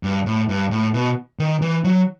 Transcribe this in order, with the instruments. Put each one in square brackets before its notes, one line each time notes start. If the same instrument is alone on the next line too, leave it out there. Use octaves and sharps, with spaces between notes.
[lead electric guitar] G2
A2
G2
A2
B2
D#3
E3
F#3